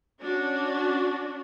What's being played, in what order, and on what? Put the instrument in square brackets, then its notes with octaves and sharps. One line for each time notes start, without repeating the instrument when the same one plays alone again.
[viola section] C#4 D4 F#4